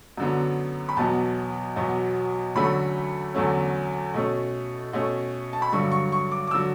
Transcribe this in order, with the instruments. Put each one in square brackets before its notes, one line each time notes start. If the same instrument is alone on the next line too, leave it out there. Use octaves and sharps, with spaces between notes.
[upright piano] F#2 D3 F#3 B3
B5
E2 B2 F#3 B3 A5
E2 B2 F#3 B3
E2 D3 F#3 A3 C#4 B5
E2 D3 F#3 A3 C#4
B2 A3 C#4
B2 A3 C#4
A5
B5
G2 D3 F#3 C#6
C#6
C#6
D6
D6
D3 F#3 E6